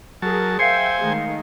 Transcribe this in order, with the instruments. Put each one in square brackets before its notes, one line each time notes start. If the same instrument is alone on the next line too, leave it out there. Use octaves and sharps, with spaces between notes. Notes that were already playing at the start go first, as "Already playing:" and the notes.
[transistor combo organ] F#3 A5 [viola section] G#4 A#4
[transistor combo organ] C5 G#5 [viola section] E5 G5 [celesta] F5 C7 C#7
[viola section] D#3 G#3 A3